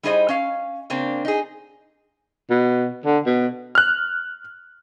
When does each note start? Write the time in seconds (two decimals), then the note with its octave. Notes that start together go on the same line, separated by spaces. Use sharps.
0.03 G3 D#4 E4 G#4 C5 D#5
0.29 C#4 F5
0.90 C#3 A#3 C4 D4
1.25 D#4 G#4
2.50 B2
3.05 D3
3.26 B2
3.75 F6 F#6